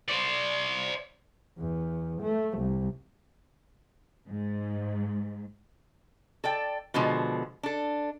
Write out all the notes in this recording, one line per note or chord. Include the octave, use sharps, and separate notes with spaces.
C5 D5
E2
A3
C2
G#2
A4 D5 G5
B2 D3 F3 G#3
D4 A4